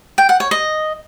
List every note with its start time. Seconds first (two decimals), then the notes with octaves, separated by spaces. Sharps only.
0.18 G5
0.29 F#5
0.40 C#5
0.51 D#5